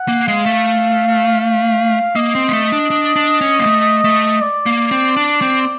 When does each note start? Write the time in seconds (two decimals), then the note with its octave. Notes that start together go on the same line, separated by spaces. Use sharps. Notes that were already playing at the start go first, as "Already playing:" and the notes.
Already playing: F#5
0.08 A#3
0.27 G#3 F5
0.46 A3
1.40 F5
2.16 A#3 D#5
2.35 C4
2.49 A#3
2.53 A3
2.72 D4
2.90 D4
3.16 D4
3.41 C#4
3.60 A#3
3.66 A3
4.04 A3
4.41 D5
4.66 A#3
4.91 C4
5.17 D4
5.42 C4